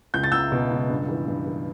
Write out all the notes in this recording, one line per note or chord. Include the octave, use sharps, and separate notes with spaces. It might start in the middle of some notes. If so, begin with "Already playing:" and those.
C#2 G6
A6
C#2 E6 G6
B2
C#2
G2
E3
G2
E3